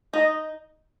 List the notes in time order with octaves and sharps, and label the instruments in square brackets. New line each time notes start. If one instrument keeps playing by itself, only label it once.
[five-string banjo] D#4 [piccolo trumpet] D#5